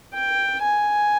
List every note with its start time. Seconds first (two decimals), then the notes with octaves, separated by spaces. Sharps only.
0.14 G5
0.62 G#5